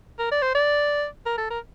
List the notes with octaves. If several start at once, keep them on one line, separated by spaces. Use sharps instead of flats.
A#4
D5
C5
D5
A#4
A4
A#4